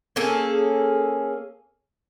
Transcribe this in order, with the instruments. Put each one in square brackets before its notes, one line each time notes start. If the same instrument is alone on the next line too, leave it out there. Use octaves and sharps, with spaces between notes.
[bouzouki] A#3 C#4 G#4 A4